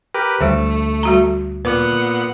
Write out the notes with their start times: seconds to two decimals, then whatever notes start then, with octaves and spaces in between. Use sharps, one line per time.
0.14 G4 A#4 B4
0.41 D2 G3 A3 C5
1.03 G3 F#4 A#5
1.65 A#2 B3 B4 F#5 D6